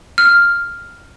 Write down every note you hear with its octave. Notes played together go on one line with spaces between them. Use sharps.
F6